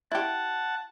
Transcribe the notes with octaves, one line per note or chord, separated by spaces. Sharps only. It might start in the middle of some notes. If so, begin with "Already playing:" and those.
E4 G4 F#5 A5